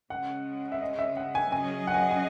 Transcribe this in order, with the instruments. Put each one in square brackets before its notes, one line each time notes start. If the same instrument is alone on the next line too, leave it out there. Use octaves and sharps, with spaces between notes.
[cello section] C#3 G#3 C#4 [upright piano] F#5
[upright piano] E5
D#5
E5
F#5
G#5
[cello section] C#3 F#3 C#4 G#4 D#5 [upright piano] G#5
[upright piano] F#5
G#5
F#5
G#5